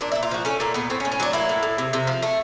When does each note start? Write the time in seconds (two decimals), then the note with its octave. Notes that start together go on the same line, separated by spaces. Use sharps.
0.01 A#2 D4
0.12 E4
0.15 A#2
0.23 F4
0.31 F3 F#4
0.45 A3 C#4
0.60 A#2 A#3
0.74 A#2 B3
0.90 A2 C4
1.00 C#4
1.05 A2
1.12 C#4
1.20 F#3 D4
1.33 A#3 E4
1.49 A2
1.63 A2
1.78 C3
1.93 C3
2.07 F3
2.23 A3